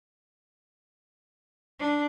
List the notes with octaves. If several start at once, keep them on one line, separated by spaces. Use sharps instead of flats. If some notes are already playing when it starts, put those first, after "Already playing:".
D4